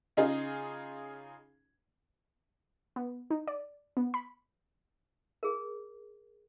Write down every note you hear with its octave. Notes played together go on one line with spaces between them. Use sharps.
C#3 D#4 F4 G#4
B3
D#4
D5
B3
B5
G#4 A#4